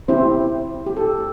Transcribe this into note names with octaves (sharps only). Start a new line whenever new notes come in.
C4 E4 G4 C5
G4
A4